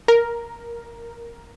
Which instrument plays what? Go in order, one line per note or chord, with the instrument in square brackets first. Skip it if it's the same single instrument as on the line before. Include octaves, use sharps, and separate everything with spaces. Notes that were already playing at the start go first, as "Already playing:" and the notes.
[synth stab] A#4